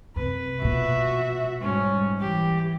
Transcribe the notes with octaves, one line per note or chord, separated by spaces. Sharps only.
F#2 C3 B4
A#1 B2 F#4 E5
G#2 G3 C#4
E3 G4